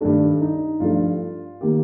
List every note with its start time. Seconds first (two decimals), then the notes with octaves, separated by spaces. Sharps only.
0.01 G2 D#3 A3 D4
0.41 D#4
0.80 G2 F3 A3 F4
1.61 D#3 A#3 G4